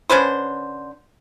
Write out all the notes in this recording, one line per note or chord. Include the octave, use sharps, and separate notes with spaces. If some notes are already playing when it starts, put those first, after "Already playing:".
D3 C#4 B4 C5